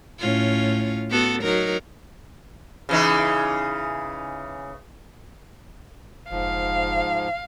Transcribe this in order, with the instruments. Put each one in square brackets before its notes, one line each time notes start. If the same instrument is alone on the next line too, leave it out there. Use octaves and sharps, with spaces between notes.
[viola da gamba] A2 C#4 F4
B3 F#4 A4
F#3 D#4 A#4
[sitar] C#3 E3 D#4
[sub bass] F1 [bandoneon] G#2 F3 [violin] F5